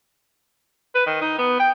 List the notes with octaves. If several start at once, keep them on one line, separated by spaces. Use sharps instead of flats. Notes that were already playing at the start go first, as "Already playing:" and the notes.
B4
D#3
D#4
B3
G5